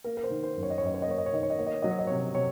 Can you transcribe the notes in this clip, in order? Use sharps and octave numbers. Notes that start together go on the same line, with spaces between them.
A#3 A#4
A#4
C5
D#3
C5
F#2
C#5
D#5
C#5
F#2 D#5
C#5
D#5
A#3 C#5
D#5
C#5
D#3 D#5
C#5
D#5
A#3 C#5
D#5
C#5
F#3 D#5
C#5
D#5
C3 C#5
C3 C#5